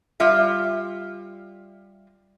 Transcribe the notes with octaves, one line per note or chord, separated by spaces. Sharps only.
G3 F4 E5